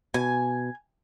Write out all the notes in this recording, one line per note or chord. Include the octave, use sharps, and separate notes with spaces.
B2 G#5